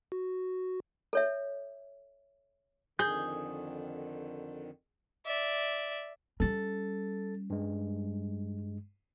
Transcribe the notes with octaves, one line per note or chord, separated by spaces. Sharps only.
F#4
A4 C#5 E5
F2 D3 D#3 G#4 G6
D5 E5
G3 C#4 A4 A6
G2 G#3